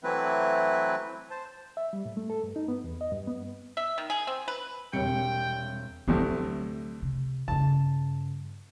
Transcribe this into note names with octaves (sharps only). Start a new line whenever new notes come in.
E3 F#3 A3 C4 E4 B4
C5 A5
E5
G3
A2
A3
A4
G2
D#4
B3
E2
D#5
G2
B3
E5
D#3
G#4
C4
B4
E1 C3 G3 C#5 G5 C#7
D2 A2 C3 F#3
C3
G2 C#3 A5